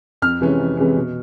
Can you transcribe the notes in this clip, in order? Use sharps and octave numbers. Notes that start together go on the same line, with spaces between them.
F2 F6
C3 E3 G#3 C#4
F2
C3 E3 G#3 C#4
B2